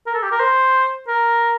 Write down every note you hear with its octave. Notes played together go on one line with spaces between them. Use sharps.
A#4
A4
G4
A#4
C5
A#4